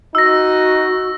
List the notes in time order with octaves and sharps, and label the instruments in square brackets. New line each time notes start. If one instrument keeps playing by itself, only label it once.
[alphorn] D#4 [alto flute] F#4 [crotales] E6 A#6